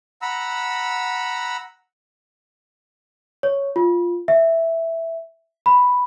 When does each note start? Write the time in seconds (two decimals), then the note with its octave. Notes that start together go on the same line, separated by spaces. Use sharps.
0.22 F#5 A#5 B5 E6
3.43 C#5
3.76 F4
4.28 E5
5.66 B5